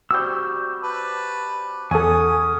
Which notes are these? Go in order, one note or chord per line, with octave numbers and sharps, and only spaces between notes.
G3 C4 F#4 E6 G6
B4 A5
E2 C#4 G#4 A4 F#5 G#5 D#6